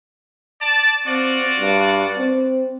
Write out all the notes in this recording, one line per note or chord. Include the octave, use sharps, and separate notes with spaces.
D5 A5
C4 F4 F#4 D5
G2
C4